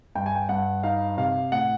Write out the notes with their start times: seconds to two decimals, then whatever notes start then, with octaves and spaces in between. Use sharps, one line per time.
0.15 G2 G5
0.26 G#5
0.35 G5
0.49 G2 F#5
0.83 D#4 F5
1.17 C3 F5
1.52 A2 F#5